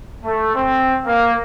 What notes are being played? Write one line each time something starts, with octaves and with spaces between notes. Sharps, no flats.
A3
C4
A#3